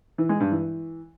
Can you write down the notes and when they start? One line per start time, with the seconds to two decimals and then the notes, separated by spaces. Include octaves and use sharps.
0.18 E3
0.29 G#3
0.40 G2
0.51 E3